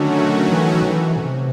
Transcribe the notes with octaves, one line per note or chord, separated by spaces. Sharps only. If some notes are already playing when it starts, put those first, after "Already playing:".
Already playing: D3 D#3 F#3 A3 C#4 F#4
E3
E3
C3